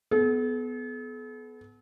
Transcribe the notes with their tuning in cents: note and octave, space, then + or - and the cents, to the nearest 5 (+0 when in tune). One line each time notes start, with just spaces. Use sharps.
B3 +10 A4 -45